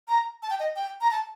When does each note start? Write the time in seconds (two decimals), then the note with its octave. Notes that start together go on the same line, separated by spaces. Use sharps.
0.08 A#5
0.43 A5
0.50 G5
0.60 D#5
0.76 G5
1.01 A#5
1.11 A5